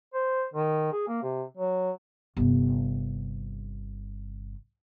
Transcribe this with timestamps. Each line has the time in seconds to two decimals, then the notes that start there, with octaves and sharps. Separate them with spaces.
0.14 C5
0.54 D#3
0.92 G#4
1.07 A#3
1.22 C3
1.57 F#3
2.37 G1 C3